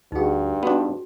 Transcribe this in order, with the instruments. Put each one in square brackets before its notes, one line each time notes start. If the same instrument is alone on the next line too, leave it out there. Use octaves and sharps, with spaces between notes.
[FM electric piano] D2 F#4 [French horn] G2 [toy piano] D#4 G#4
[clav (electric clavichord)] B3 D4 [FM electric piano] D#4 [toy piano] F#4